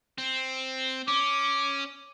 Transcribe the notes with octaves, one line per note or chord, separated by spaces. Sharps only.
C4
C#4 D6